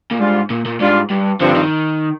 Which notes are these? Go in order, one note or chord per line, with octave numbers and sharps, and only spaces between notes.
A#2
G#2 G3 D4 F4
A#2
A#2
G#2 G3 D4 F4
G2
G2 D3 F3 C4
D#3